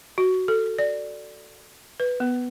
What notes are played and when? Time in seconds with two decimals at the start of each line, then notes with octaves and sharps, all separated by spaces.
0.18 F#4
0.48 A4
0.79 D5
2.00 B4
2.20 B3